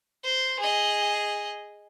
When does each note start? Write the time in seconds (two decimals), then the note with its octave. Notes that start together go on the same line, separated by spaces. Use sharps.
0.23 C5
0.59 G#4 D#5